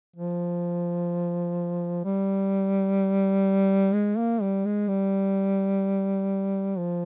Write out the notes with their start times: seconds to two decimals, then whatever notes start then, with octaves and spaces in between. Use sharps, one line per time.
0.16 F3
2.05 G3
3.94 G#3
4.18 A#3
4.42 G3
4.65 G#3
4.88 G3
6.77 F3